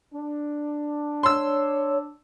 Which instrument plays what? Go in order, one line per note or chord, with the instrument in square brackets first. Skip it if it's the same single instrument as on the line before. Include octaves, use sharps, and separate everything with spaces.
[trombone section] D4
[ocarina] C#5 [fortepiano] C6 E6